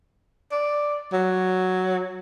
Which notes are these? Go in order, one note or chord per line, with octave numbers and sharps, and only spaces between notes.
D5
F#3